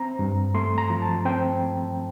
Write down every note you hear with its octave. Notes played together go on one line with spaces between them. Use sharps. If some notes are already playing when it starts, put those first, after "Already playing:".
Already playing: C4 A#5
G2
A3 C6
A#5
F3
A5
C4 G5